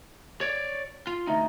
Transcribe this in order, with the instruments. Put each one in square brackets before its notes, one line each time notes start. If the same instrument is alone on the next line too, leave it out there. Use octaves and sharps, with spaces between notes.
[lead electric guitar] C#5 D5
F4
[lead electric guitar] D2 D#4 [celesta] E5 A#5 A#6